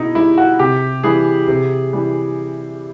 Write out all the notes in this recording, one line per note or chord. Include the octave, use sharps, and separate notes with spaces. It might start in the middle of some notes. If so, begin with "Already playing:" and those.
Already playing: B2 D#4 E4
G3 E4
F#4
C3 G4
E3 G3 G#4
C3
E3 G3